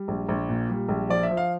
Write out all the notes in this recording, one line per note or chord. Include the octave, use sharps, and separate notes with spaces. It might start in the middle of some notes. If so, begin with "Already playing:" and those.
Already playing: G3
A#1
A#1
A#2
G3
A#1
F3 D5
E5
F3
F5